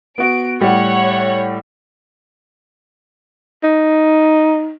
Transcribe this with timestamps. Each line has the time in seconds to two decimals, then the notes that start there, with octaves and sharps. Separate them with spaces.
0.18 B3 F#4 D7
0.61 A2 G3 C#5 F#5
3.63 D#4